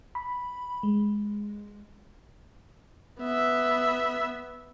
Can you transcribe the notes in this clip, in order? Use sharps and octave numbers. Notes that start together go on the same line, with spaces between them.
B5
G#3
B3 E5